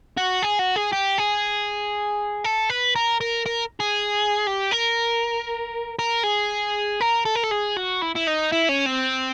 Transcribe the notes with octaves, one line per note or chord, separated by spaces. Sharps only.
F#4
G#4
F#4
G#4
G4
G#4
A4
B4
A#4
A#4
A#4
G#4
G4
A#4
A#4
G#4
A#4
A4
A#4
A4
G#4
F#4
E4
E4
D#4
E4
C#4
C4